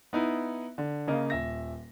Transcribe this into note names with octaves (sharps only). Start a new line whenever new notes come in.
B3 D#4 E4
D3
C#3 A#3 D#5
D#1 E5 A#6